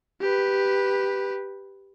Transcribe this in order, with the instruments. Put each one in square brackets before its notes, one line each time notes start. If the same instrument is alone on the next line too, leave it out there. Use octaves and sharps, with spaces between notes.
[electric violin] G4 B4